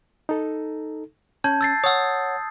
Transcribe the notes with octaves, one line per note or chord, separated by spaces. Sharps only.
D#4 A4
C#4 A5 G6 G#6
E6 A6 C7
C#5 F#5 D#6 E6